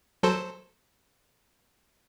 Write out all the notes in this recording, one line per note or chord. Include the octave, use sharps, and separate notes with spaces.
F#3 A4 C5